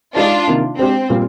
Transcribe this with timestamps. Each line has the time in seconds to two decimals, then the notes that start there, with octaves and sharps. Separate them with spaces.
0.16 G#3 D4 D#4 F4 G4
0.47 C3 D#3 A#3 D#4
0.78 G#3 C4 D4 G4
1.10 A#2 G3 C4 F4